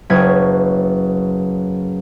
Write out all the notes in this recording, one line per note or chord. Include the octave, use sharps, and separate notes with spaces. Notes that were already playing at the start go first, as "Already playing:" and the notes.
F#1 B4 C#5 D#6 G#6